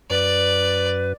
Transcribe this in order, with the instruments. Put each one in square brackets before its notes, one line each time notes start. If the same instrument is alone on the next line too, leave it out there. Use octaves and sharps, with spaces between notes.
[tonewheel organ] F#2 [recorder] B4 [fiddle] D5